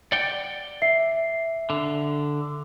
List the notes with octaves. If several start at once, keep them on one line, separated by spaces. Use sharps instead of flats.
D5 F#5 G5
E5 C7
D3